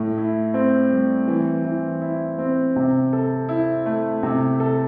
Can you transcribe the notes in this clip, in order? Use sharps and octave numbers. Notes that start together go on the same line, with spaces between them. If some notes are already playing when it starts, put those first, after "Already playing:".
Already playing: A2
E4
C4
G3
E3
E3
E4
C4
C3
A4
E4
A3
C3
A4